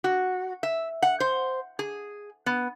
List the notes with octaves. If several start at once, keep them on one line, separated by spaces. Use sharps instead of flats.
F#4
E5
F#5
C5
G#4
B3